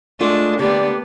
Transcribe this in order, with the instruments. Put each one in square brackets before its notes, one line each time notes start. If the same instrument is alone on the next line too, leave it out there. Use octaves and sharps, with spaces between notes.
[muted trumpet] G#3 [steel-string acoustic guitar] A3 F4 [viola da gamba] D4
[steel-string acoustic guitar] D3 [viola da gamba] A#3 B3 [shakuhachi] G4 [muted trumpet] D5